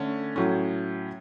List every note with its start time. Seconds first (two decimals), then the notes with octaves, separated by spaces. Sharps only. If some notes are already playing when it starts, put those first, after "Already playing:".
Already playing: D3 A3 C#4
0.36 A2 F#3 C#4